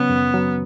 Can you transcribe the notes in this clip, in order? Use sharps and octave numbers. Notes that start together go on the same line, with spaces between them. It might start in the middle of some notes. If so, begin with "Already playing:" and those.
Already playing: C#3 F#3 B3 C#4
F#2
F#3